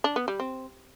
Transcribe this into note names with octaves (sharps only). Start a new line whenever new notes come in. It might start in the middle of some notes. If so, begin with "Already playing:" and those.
D4
B3
G3
C4